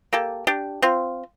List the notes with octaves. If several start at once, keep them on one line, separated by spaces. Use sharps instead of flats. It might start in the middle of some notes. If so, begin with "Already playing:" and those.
A#3 G4 A4
D4 G4
C4 F4